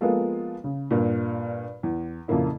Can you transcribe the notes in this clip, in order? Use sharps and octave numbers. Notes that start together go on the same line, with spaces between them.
F3 G#3 A#3 B3 F4 A4
C#3
G2 A#2
E2
F2 A#2 C#3 A#3 E4